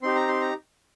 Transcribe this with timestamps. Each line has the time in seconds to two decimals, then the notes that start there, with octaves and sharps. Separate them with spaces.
0.03 C4 D#4 G4 C6
0.15 A#5
0.28 C6
0.40 A#5